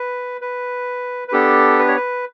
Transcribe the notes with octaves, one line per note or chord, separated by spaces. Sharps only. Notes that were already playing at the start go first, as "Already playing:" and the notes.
Already playing: B4
B4
B4
B3 D4 G4 A4
B4
C#5
B4